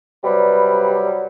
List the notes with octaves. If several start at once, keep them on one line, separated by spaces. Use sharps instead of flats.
C3 F#3 G3 B4